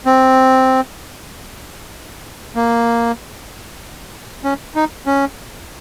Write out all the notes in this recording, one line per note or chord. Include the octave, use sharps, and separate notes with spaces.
C4
A#3
C#4
D#4
C#4